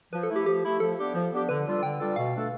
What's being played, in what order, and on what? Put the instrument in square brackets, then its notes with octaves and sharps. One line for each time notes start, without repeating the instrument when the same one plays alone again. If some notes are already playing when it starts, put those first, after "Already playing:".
[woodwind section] F3 [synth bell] B4
[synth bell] A4
[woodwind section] A3 E4
[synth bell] G4
[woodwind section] F3 [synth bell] G4
[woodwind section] A3 E4
[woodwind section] F3 [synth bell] A4
[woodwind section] B3 D4 G4
F3
B3 D4 G4
[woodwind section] D3 [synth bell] B4
[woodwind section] G3 D4 F4 A4
[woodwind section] D3 [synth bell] G5
[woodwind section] G3 D4 F4 A4
[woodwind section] B2 [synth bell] F5
[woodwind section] A3 D4 A4